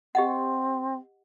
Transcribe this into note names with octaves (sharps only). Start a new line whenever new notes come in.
C4 G4 D#5 F#5